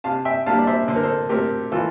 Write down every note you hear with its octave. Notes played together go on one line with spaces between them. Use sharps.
C3 F5 A5
E5 G5
G3 A#3 D4 F5 A5
D5
C5 E5
D3 C5
A#4
A4 C5
A3 C4 G4 A#4
E3 F4 A4